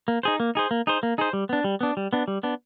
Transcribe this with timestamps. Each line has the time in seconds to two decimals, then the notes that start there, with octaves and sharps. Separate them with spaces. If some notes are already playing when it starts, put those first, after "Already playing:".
0.08 A#3
0.23 D#4 G#4 C5
0.40 A#3
0.55 D#4 G#4 C5
0.71 A#3
0.87 D#4 G#4 C5
1.03 A#3
1.18 D#4 G#4 C5
1.33 G3
1.49 B3 D4
1.64 G3
1.81 B3 D4
1.97 G3
2.13 B3 D4
2.28 G3
2.43 B3 D4